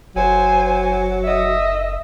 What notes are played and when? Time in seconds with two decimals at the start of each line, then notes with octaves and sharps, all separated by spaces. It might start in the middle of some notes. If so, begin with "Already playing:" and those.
0.16 F#1 F#3 C5 G#5
1.23 D#5 E5